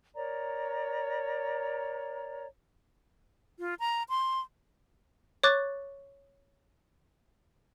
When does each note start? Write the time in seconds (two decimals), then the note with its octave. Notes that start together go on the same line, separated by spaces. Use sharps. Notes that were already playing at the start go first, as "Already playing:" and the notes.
0.15 A#4 C#5 D5 A#5
3.59 F4
3.80 A#5
4.09 C6
5.43 C#5 C#6 D6 F#6 A6